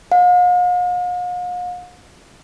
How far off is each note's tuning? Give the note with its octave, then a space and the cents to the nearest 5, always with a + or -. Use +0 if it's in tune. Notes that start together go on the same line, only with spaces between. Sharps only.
F5 +45